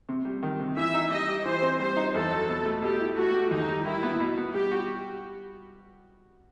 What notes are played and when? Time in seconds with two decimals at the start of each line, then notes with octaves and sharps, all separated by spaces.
0.09 C3
0.25 G3
0.43 D#3
0.60 C3
0.77 E3 E5
0.94 D#4
1.11 G3 D#5
1.28 G4
1.45 E3 C5
1.62 C4
1.80 G3 C5
1.97 D#4
2.14 E2 A4
2.31 F#3
2.49 B2
2.66 A3
2.82 B2 G4
3.00 E4
3.17 A3 F#4
3.34 G4
3.51 D#2 D#4
3.68 G3
3.85 D#3 E4
4.03 B3
4.20 B2
4.38 B3
4.54 G3 G4
4.71 F#4